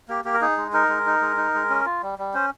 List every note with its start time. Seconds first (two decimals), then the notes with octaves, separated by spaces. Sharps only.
0.09 A#3 G4
0.25 A#3 G4
0.34 A#4
0.41 D#4 G#4
0.57 G#3
0.73 D#4 A#4
0.89 G#3
1.06 D#4
1.21 G#3
1.37 D#4
1.54 G#3
1.70 C#4
1.85 F4
2.03 G3
2.19 G3
2.34 C#4 C5